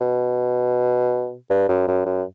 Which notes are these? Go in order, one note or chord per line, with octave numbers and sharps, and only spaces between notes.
B2
G2
F#2
F#2
F#2